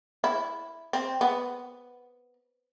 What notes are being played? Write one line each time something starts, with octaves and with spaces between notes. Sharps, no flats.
E4
C4
B3